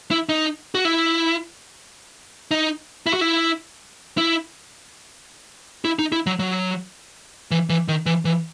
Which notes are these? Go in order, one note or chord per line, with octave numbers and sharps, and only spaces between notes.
E4
D#4
F#4
E4
D#4
E4
F#4
E4
E4
E4
D#4
E4
F#3
F#3
E3
E3
D#3
E3
E3